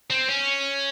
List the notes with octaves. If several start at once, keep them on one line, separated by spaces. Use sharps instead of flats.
C4
C#4